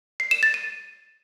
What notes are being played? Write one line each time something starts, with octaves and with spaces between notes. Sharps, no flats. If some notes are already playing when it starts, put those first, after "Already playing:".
C7
E7
A6
D#7